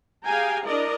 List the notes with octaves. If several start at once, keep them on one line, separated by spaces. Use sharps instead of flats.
G4 G#4 F5 G5 G#5 A#5
D4 E4 A#4 D5 D#5